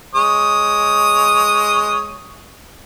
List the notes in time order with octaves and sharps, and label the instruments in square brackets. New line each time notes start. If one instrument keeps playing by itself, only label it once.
[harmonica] G#3 C#5 D#6